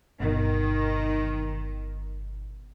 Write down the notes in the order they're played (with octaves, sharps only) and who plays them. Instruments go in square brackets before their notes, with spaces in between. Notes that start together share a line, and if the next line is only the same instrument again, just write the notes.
[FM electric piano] G1 B2 [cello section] D#3